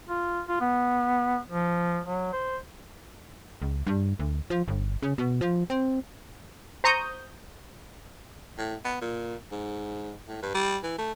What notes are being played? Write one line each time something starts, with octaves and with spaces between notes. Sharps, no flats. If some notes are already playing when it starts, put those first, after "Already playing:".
F4
F4
B3
F3
F#3
C5
C#2
G2
D2
F3
G1
C#3
B2
F3
C4
C5 A#5 C#6 D#6 G6
A2
B3
A#2
G#2
A2
G2
G3
E3
A3